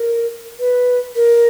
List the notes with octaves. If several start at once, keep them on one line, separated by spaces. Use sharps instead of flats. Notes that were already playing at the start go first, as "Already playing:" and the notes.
Already playing: A#4
B4
A#4